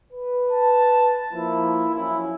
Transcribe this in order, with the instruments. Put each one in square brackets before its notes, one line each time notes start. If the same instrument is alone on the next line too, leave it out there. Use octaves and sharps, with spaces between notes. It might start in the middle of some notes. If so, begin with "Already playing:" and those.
[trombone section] B4
[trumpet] A5
[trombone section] F3 A#3 [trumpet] E4
[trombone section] F3 F#3 C#4 [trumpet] E4